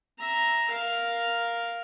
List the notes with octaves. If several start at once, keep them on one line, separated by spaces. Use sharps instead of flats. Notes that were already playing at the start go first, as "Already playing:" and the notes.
E5 A#5
A#4 F5